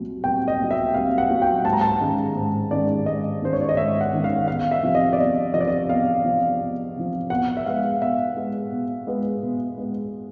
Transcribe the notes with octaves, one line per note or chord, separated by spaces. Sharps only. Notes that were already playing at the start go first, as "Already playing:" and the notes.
Already playing: C2 A#2 F#3
C2 G5
D#5
A#2 F#3
E5
C2 F5
F#5
A#2 F#3
G5
G#2 A5
A#5
A5
D#3 G#3 C#4
G#2
D#3 G#3 C#4 D5
G#2 D#5
D#3 G#3 C#4 C5
C#5
D5
D#5
G#2 E5
F#5
D#3 G#3 C#4
F5
E2 F5
E5
C3 F3
D#5
D5
E2 D#5
C3 F3 D#5
D5
D#5
E2 F5
C3 F3
E2
C3 F3
B2 F#5
E5
G#3 B3 F5
B2 E5
G#3 B3
B2
G#3 B3
B2
G#3 B3